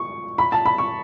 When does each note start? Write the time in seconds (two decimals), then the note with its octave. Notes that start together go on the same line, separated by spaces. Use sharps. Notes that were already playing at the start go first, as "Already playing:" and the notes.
Already playing: C#6
0.38 B5
0.52 A5
0.65 B5
0.78 C#6